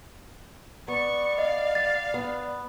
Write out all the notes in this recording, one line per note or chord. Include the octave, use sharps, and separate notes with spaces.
B3 D5 C#6
D#5 F5
A6
B3